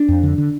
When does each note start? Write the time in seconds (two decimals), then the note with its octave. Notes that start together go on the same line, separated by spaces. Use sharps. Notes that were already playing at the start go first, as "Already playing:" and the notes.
Already playing: D4
0.08 F2
0.23 D3
0.38 D3